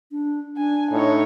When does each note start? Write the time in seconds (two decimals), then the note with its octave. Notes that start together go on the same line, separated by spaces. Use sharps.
0.12 D4
0.57 D4 G#5
0.91 A2 D#4 C#5